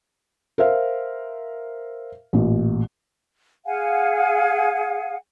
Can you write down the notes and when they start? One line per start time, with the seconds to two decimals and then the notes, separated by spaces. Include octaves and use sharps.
0.58 A#4 C5 E5 F5
2.33 A1 A#2
3.66 G#4 F5 F#5 G#5